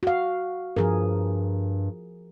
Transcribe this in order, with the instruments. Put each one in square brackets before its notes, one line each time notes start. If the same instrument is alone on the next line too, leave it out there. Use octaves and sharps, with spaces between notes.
[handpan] F#4 F5
[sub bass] G2 [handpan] F3 G#4 A#4